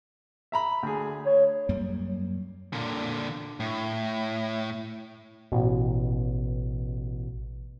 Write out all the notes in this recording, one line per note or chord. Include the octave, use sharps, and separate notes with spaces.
E5 A#5 B5
D2 G#4
C#5
F#2 G3 A#3
A#2 D3
A2
A1 B2